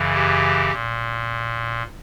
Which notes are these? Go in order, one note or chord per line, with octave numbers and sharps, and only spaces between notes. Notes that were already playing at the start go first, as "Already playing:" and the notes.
Already playing: F#2 C#3 E3
G4
A#2